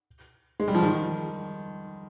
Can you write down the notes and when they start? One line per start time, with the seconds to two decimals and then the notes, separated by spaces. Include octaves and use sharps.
0.60 G#3
0.68 G3
0.74 F3
0.83 D#3